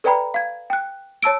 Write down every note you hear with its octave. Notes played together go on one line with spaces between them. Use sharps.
A4 B4 D5 G5 A#5 B5
F5 G#6
G5 F#6
C#5 A5 E6 D7